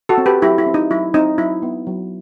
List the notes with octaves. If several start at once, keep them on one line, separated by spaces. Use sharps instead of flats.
F#4 A4
C4
G4 B4
F#3 E4 G4
E4
C4
D#4
F#3 E4
C4 D#4
F#3 E4
B3
F#3